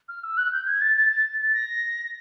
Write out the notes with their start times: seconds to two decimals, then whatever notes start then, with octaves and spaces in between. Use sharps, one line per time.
0.08 F6
0.23 E6
0.37 F#6
0.52 G6
0.67 G#6
0.81 A6
0.96 A6
1.11 A6
1.40 A6
1.53 A#6